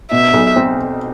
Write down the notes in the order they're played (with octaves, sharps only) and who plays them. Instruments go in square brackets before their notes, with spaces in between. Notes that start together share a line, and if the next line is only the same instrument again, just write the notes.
[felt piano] B2 [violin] E5
[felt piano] B1
C4